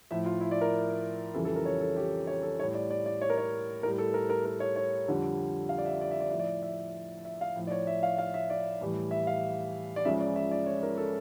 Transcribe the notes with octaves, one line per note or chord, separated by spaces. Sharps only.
A2 F3 E5
F4
E4
D5
A#4
F2 C#3 E3 G3 A4
A4
A#4
C#5
A4
G4
C#5
A4
A2 G3 C#5
D5
D5
D5
C#5
A#4
C#5
A2 G3 A#4
A4
A#4
A#4
A#4
C#5
C#5
F2 D3 G3
F5
D5
E5
D5
E5
D5
A2 F3 E5
D5
E5
E5
F5
A2 F3
D5
C#5
E5
F5
F5
E5
D5
A2 E3 G3
E5
F5
D5
C#2 C#3 F3 E5
D5
E5
D5
C#5
A#4
A4